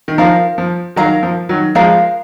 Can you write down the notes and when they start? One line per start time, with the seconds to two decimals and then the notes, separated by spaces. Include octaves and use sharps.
0.08 D#3
0.18 F3 A#4 F5 A#5
0.58 F3
0.96 D#3 F#3 A#4 F5 A#5
1.23 F3
1.49 D#3 F#3
1.75 F3 G#3 A#4 F5 A#5